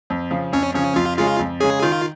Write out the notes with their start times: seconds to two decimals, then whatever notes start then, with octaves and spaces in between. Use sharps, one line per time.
0.10 F2
0.31 C#3 F3
0.52 F2 C#4
0.74 C#3 F3 C#4
0.96 F2 F4
1.17 C#3 G#3 C#4 F4
1.39 F2
1.60 C#3 G#3 C#4 G#4
1.83 D#3 F4